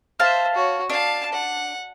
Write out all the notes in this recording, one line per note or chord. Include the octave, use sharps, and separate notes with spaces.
C5 E5 F5 A5
F#4 C#5
D4 F5 A5
F#5